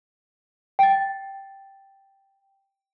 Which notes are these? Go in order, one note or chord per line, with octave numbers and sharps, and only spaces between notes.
G5 A6